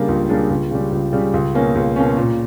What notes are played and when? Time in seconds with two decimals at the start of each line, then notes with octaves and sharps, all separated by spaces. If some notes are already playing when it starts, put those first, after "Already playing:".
Already playing: C#3 G3 A#3 D4
0.08 C#2
0.29 C#3 G3 A#3 D4
0.50 C#2
0.71 C#3 G3
0.92 C#2
1.13 C#3 G3
1.34 C#2
1.55 B2 A#3 C#4
1.75 C#2
1.96 B2 A#3 C#4
2.17 A#2